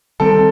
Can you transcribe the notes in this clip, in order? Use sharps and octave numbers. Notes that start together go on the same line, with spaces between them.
D#3 G3 C4 A4